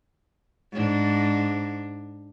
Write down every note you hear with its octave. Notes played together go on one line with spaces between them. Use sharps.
G#2 D4